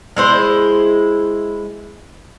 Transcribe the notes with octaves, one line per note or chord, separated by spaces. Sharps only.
G#3 E4 C5